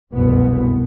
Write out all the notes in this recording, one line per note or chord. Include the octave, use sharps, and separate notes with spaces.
F1 C2 F#2 B2 B3